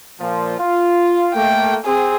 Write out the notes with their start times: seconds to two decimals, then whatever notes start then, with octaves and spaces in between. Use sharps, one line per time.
0.20 A#2 F3
0.59 F4
1.35 A3 A#3 G5
1.86 C4 G#4